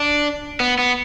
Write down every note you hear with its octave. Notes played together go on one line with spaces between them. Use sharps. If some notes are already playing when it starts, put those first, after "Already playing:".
Already playing: D4
B3
B3